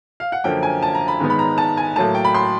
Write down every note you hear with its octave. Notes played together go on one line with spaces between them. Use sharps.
F5
F#5
F#2 D3 F3 A#3 G5
G#5
A5
A#5
B5
G#2 D#3 G#3 B3
B5
A#5
A5
G#5
A2 F#3 A#3 A5
G5
B5
C6